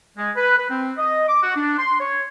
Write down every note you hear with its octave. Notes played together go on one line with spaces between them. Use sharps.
G#3
B4
B4
C4
D#5
D6
F#4
D4
C6
C#5